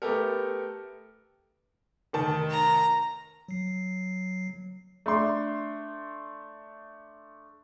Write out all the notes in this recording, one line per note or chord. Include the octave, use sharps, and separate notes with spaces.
A3 B3 G4 A4 A#4
F1 D#3 A5
A#5
F#3 C7
A3 D4 C6